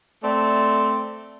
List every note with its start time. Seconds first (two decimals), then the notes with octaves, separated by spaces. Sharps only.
0.24 A3 C4 D5